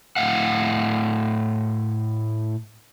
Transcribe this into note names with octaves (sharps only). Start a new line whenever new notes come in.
A2 F5 F#5